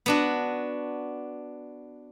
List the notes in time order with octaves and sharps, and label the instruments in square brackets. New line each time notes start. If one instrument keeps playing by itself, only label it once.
[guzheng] B3 D4 F#4